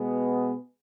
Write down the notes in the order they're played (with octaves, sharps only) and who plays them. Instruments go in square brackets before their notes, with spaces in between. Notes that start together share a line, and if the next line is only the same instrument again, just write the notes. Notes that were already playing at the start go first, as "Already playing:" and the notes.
Already playing: [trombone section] B2 G#3 B3